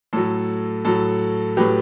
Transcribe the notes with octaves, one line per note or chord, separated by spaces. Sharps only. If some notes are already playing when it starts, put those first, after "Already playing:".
A2 F#3 A4
A2 F#3 A4
A2 F#3 G4 B4